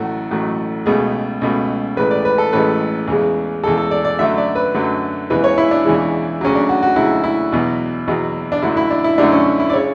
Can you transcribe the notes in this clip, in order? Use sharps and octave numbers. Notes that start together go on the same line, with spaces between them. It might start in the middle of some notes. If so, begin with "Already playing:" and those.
Already playing: A1 A2 F#3 A3 F#4
A1 A2 F#3 A3
C#2 B2 A3 G#4
C#2 B2 A3
A1 A2 G#3 B4
D5
B4
A4
A1 A2 G#3 B4
E2 C#3 G#3
E2 C#3 G#3 A4
A4
D5
D5
F#2 D3 F#3 A3 E5
D5
B4
F#2 D3 F#3 A3
E2 C#3 E3 G#3 B4
C#5
E4
D4
E2 C#3 E3 G#3
D2 C#3 F#3 C#4
D4
F#4
F#4
D2 C#3 F#3 E4
E4
E2 B2 F#3
E2 B2 F#3
D4
F#2 D3 F#3 A3 E4
E4
D4
E4
F#2 D3 F#3 A3 D4
C#4
E4
D5
C#3 C#5